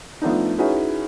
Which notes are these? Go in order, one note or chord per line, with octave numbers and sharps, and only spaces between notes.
F3 A3 B3 D4 D#4
C#4 D#4 E4 F#4 G#4 B4